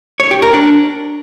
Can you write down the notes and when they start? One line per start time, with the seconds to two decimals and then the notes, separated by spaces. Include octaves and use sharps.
0.20 C#5
0.31 G4
0.42 A#4
0.53 D4